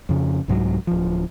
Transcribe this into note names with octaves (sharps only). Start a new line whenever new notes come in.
F2 C#3
C2 G#2 F#3
D1 F3